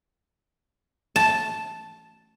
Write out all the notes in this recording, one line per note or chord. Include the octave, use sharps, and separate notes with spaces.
A5